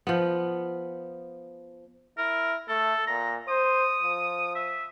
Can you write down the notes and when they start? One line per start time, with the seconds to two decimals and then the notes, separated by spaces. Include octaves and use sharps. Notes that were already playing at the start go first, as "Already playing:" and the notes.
0.07 F3 B3
2.18 E4 A#4
2.69 A3 A4
3.07 A#2 A#5
3.48 C5 D#6
4.03 F3
4.55 E5